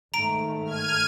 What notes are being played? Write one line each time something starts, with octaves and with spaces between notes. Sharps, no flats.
G#2 D#3 A3 A#5 D7
F6 G#6 D#7